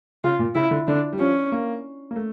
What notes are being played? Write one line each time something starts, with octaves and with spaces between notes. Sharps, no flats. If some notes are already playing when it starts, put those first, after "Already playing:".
C#3 F4
A#2
C#3 E4
D3
D3 D4
G3
F3 C#4
A#3
A#3
A3